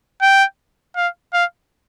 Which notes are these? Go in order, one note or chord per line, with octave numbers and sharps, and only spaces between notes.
G5
F5
F5